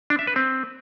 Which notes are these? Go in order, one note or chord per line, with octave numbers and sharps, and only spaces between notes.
D4
E5
B4
C4